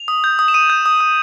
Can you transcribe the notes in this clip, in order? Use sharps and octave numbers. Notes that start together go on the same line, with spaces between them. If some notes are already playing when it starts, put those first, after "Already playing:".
Already playing: F7
D#6
G6
D#6
E7
D#6 D#7
G6
D#6
D#6